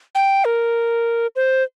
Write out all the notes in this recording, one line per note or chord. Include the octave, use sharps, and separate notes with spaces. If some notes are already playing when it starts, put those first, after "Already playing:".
G5
A#4
C5